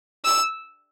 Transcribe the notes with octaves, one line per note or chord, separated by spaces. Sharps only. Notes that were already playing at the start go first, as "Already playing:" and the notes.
E6